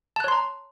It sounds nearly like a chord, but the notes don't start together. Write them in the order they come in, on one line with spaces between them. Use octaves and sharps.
A5 F#6 C#5 C6 A#5